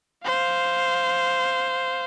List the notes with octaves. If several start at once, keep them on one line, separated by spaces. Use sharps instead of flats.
C5 F5